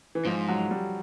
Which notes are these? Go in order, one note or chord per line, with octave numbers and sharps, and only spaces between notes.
E3
G#2 F3
F#3
G3